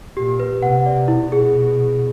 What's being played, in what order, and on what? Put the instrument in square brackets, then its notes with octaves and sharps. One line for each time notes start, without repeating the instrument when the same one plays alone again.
[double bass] A#2 [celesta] G4
[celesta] B4
[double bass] C3 [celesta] F#5
[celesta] D5
[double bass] B2 [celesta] E4
[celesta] G#4